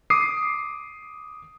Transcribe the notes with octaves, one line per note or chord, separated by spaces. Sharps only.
D6 D#6 C7